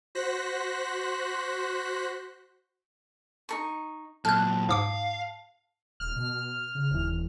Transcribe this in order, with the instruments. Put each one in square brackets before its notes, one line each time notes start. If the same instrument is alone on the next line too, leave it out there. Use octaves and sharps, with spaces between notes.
[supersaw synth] F#4 C5 F#6 A#6 B6
[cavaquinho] D#4 A#4 C#6
[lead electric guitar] A#2 F#3 [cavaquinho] A4 [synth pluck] F6 F#6
[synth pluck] G#2 D6 C7 [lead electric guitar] F5
[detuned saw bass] D#1 [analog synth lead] F6
[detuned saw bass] B2
C#3
[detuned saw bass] E1 [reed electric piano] D#2 E3